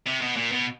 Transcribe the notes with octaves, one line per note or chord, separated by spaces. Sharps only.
C3
B2
A#2
B2